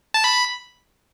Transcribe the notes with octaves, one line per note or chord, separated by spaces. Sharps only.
A5
B5